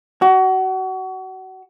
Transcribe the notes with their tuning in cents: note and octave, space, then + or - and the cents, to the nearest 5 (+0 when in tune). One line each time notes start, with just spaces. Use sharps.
F#4 +30